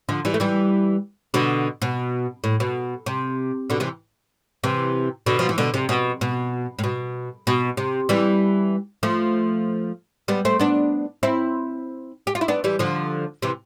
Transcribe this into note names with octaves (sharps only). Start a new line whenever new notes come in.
D3 F3
E3 G3
A3
E3 G3
B2 D3
B2
A2
B2
C3
B2 D3
C3 E3
C3 E3
B2 D3
F3
E3
B2 D3
C3
B2
B2
A2
B2
B2
C3
E3 G3
F3 A3
G3 B3
A3 C4
B3 D4
C4 E4
G4
F4
E4
B3 D4
E3 G3
D3 F3
C3 E3